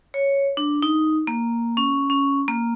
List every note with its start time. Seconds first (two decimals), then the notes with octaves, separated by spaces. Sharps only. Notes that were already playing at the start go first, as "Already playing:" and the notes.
0.14 C#5
0.57 D4
0.82 D#4
1.27 A#3
1.77 C#4
2.10 C#4
2.48 A#3